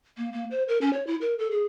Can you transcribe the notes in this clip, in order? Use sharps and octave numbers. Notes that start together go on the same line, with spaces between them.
A#3
A#3
C5
A#4
C#4
C#5
E4
A#4
A4
G#4